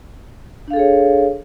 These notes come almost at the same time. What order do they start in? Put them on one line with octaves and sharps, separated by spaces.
D4 F5 A4 G#4 C#5